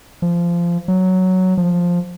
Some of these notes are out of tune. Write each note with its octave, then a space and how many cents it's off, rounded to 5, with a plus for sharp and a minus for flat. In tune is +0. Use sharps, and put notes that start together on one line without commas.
F3 -20
F#3 +5
F3 +5